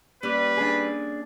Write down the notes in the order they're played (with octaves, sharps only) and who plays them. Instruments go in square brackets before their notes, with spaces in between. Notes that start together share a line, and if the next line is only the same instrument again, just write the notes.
[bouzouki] G3 [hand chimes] A#3 C#4 D6 [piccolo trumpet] B4
[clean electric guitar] D4 G#4